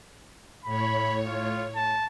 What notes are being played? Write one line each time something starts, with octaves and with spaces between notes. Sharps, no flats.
A2 C#5 B5
F4
A5